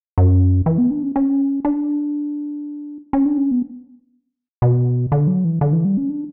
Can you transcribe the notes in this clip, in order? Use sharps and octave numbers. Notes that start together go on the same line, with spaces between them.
F#2
E3
B3
D4
C#4
C#4
D4
C#4
D4
C#4
B3
B2
D3
F#3
E3
D3
E3
G3
C#4
D4